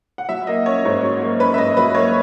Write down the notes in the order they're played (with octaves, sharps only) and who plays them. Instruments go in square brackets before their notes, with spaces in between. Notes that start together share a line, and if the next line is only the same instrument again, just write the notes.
[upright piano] F#5
F#3 E5
A#3 D#5
C#4 C#5
G#2
F#3
A#3
C#4 B4
E5
G#2 D#5
F#3 B4
A#3 C#5